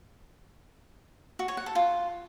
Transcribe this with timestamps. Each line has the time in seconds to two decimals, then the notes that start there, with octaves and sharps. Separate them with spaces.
1.39 F#4
1.48 C#5
1.57 F#5
1.66 A4
1.75 F4